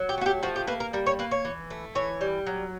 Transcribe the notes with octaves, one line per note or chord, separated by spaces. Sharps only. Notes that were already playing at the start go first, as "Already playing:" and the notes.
Already playing: F#3
G4
A3 F#4
G4
F3 F#4
G4
A#3 B4
A#4
G3 A#4
C#5
A#3 B4
C#5
E3
A3
E3 C#5
G3
F#3